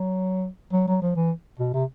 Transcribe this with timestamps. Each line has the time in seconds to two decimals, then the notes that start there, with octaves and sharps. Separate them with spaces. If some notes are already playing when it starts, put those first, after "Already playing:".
Already playing: F#3
0.73 F#3
0.87 F#3
1.02 F3
1.16 E3
1.60 B2
1.74 C3